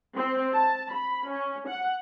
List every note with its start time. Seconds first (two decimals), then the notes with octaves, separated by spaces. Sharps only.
0.15 C4
0.54 A5
0.92 B5
1.29 C#4
1.68 F#5